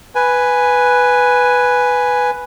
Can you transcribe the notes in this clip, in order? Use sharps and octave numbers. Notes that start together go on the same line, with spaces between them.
B4 G#5